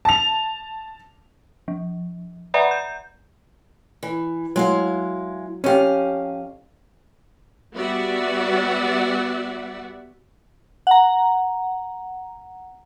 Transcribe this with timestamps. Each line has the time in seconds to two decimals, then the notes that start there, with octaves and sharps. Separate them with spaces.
0.05 A5 F7
1.68 F3
2.54 B4 D5 E5 F#5 A#5 B5
2.71 G6
4.03 E3
4.56 F#3 G#3 E4 F5
5.64 F2 C#4 G4 F5
7.74 G3 B3 F#4 D5 E5 F#5
10.87 F#5 A#5